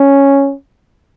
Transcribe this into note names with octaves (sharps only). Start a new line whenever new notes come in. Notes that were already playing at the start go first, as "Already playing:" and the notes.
Already playing: C#4